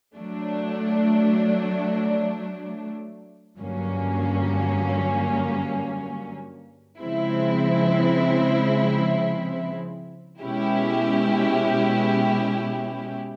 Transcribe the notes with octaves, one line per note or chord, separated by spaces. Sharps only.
F#3 A3 D4
G2 D3 F#3 A#3 C#4
C#3 F3 G#3 C4 E4
B2 G#3 C#4 E4 G4